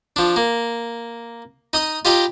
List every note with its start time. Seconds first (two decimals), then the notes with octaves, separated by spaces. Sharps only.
0.16 F3 D4
0.36 A#3
1.73 D#4 D#5 D#6
2.05 F4 G4 D#5 G5 A#5 B5